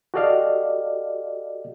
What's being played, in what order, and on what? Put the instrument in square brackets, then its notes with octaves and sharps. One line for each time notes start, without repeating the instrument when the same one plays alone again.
[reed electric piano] F#4 G4 A4 D5 D#5 F5